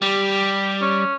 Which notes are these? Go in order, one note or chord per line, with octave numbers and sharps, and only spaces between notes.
G3 G4
C#4